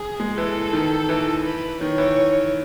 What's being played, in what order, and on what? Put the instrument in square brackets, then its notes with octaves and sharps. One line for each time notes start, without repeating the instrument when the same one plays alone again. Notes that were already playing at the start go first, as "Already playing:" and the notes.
Already playing: [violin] G#4
[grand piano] G#3
[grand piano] E3 [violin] A4
[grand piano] D#3
E3
[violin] B4
[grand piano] D#3 [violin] C#5
[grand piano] E3